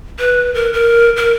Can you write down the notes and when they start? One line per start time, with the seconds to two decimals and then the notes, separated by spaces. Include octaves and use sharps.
0.19 B4
0.54 A#4
0.73 A#4
1.17 A#4